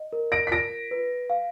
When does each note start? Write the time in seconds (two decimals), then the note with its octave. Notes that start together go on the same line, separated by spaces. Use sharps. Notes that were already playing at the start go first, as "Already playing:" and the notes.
Already playing: D#5
0.13 A#4
0.32 A#6 D7
0.47 B6
0.51 F4 A#6 D7
0.91 B4
1.30 F5